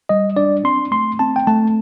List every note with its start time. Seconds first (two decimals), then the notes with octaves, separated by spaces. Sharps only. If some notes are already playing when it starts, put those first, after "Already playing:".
0.09 G3 D#5
0.36 D4 D5
0.64 C4 C6
0.91 A3 C6
1.19 C4 A5
1.36 G5
1.47 A3 A5